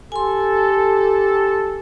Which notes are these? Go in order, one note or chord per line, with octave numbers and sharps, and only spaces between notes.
G4 A4 G#5 C6